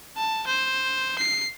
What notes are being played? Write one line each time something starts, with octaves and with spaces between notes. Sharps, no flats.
A5
C5
C7